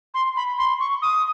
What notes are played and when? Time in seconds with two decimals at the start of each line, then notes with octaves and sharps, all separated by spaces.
0.14 C6
0.36 B5
0.58 C6
0.80 C#6
1.02 D#6